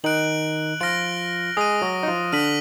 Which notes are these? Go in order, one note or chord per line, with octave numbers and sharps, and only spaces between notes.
D#3 D#4 F#6 D7 F#7
F3 F4 F6 A#6 D7 F#7
G#3 G#4 D#6 A#6 D#7
F#3 F#4
D#4
F3 F4
D3 D4 F6 B6 D#7 F#7